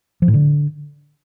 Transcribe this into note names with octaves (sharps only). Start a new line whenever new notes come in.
F3
A2
D3